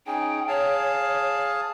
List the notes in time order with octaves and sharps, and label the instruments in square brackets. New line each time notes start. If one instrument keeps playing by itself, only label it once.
[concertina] C#4 D#4 G#4 [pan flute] G5
[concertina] G#4 F5 A5 [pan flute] C#5